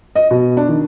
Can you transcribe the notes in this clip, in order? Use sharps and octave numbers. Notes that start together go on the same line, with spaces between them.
D#5
B2
D4
D#3